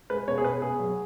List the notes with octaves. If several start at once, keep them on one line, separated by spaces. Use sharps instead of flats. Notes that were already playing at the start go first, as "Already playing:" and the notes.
G#3 B4
B2 C#5
G#4
B2 B4
B2 G#4
F#3